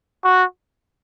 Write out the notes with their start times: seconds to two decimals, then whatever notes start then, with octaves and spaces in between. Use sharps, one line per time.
0.24 F#4